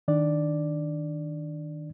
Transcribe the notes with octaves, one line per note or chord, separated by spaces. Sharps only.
D#3 D4 D5